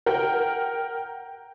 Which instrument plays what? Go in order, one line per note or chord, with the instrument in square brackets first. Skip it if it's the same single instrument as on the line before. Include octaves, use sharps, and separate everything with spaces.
[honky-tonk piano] A#4 F#5 G5